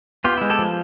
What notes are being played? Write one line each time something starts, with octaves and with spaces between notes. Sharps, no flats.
B3 F4 G4
G#3 E4
G4 A4
F3